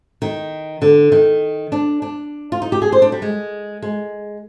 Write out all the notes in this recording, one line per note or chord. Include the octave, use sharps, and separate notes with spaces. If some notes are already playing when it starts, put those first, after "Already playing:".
D#3
D3
D#3
D4
D4
F4
D#4
G4
G#4
C5
D4
G3
G#3
G#3